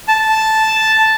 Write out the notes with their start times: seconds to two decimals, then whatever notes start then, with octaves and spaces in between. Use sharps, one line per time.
0.08 A5